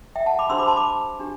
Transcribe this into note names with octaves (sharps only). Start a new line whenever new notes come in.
E5 G5
F#5 A5
B5 D6
D4 G4 C5 C6 E6
B5 D6
A5 C6
B5 D6
D4 G4